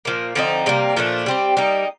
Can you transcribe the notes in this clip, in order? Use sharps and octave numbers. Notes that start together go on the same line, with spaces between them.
A#2 F3 A#3
D3 F3 C4 D#4
C3 G3 A#3
A#2 F3 A3 D4
G3 C4 G4
G3 A#3 D#4